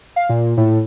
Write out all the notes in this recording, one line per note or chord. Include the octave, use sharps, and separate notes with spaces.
F5
A#2
A2